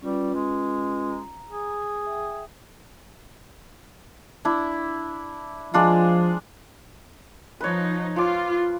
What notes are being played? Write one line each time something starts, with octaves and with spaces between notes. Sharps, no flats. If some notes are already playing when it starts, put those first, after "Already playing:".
G3 C#4 F4 B4
G#3
A#5
G#4
E5 G5
D4 E4
F3 G#3 D4 F4
F3 D#4 B4 C#5
F3 F4 D6